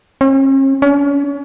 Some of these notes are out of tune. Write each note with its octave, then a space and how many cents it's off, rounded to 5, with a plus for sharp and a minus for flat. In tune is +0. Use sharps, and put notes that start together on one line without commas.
C#4 -45
C#4 +35